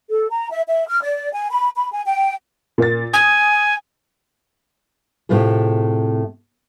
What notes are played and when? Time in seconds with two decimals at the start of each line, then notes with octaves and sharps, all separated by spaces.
0.10 A4
0.30 A#5
0.51 E5
0.67 E5
0.88 F6
1.02 D5
1.32 G#5
1.50 B5
1.74 B5
1.92 G#5
2.05 G5
2.78 A#2 A#3 A6
3.13 G#5 D#6
5.29 A2 C3 A3 F4 G#4